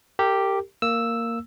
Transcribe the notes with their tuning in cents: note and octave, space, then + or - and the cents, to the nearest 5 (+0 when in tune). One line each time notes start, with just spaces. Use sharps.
G4 +0 A#4 -35
A#3 -10 E6 +0